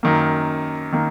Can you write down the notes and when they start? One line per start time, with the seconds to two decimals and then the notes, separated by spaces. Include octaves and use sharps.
0.03 F#2 D#3 A#3
0.92 D#3 A#3